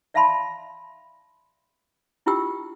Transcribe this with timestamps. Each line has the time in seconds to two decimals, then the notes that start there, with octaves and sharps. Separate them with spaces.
0.14 D5 E5 F5 A5 B5 C6
2.26 D4 E4 F4 G4 G5 E6